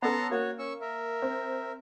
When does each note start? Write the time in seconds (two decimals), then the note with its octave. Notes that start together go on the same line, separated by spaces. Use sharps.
0.02 B3 C#4 A4 A5 A#5 C6
0.31 A#3 F#4 C#5
0.59 C#4 C#6 E6
0.81 A#4 E5
1.22 C4